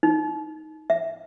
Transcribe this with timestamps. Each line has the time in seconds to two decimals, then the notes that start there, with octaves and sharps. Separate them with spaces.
0.03 D#4
0.90 E5